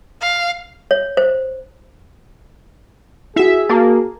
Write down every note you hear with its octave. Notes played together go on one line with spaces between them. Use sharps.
F5
C#5
C5
E4 F#4 G#4 E5
A#3 F#4 A5